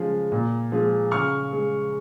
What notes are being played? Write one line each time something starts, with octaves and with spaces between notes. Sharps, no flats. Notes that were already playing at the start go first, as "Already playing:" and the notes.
Already playing: C#3 F3 G#3
A#2
F3 G#3
C#3 C#6 F6
G#3